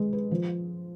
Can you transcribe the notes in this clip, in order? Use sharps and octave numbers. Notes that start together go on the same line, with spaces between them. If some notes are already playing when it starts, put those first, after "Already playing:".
Already playing: G#3 B4
B4
F3